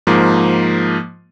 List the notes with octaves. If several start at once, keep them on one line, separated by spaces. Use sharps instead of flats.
G#2 F3 A#3